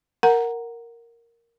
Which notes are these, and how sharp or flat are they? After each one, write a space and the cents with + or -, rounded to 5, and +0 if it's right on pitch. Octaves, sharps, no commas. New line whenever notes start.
A#4 +0 F#5 +0 A#5 +0